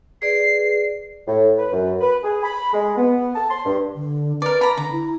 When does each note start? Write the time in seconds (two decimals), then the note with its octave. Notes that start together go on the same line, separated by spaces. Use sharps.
0.22 G#4 B4 D5 C7
1.27 A2
1.58 B4
1.72 F#2
2.01 B4
2.23 G#4
2.43 B5
2.73 G#3
2.97 B3
3.35 A5
3.50 C6
3.65 G2
3.96 D3
4.42 A#4 B4 D5
4.61 A#5 B5
4.77 D3 A#5
4.91 E4